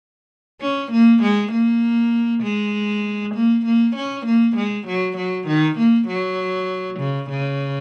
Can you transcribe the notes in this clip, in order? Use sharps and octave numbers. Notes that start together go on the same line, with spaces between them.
C#4
A#3
G#3
A#3
G#3
A#3
A#3
C#4
A#3
G#3
F#3
F#3
D#3
A#3
F#3
C#3
C#3